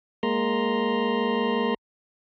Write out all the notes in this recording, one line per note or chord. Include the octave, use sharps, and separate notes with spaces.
G#3 A#3 A#5 C6